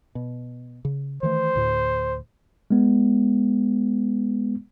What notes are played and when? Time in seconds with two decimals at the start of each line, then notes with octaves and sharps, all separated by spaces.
0.15 B2
0.85 C#3
1.23 D#3 E3 A3 C5
1.56 D2 A2
2.71 G#3 B3